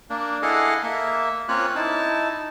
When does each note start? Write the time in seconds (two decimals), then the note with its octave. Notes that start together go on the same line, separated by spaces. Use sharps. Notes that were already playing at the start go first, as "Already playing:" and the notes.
0.10 A#3 D4
0.42 E4 G#4 A4 D#5 F5 F#5
0.83 A#3 E5
1.48 A#3 C4 C#4 F4 C#5 F#6
1.75 D#4 E4 A5